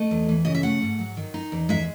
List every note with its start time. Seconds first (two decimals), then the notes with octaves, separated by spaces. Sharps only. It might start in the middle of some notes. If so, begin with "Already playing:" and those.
Already playing: A3 D#5
0.11 E2
0.29 E3
0.45 C#3 D#5
0.55 E5
0.63 A3 F#5
0.82 G#2
0.99 F#3
1.17 D#3
1.34 D#4
1.52 E2
1.69 G#3 E5